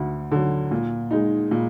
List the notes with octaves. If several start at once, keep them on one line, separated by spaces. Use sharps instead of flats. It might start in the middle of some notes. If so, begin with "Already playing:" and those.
Already playing: D2 D3
D3 F#3
A#2
G#3 D#4
A#2